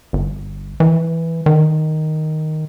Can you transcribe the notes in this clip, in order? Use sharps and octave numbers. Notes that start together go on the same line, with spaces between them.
G1
E3
D#3